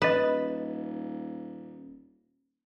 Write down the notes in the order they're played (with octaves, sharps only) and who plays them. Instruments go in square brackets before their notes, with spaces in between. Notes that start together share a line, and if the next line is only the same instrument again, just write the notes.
[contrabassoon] D#1 [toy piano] A4 D#5 [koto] B4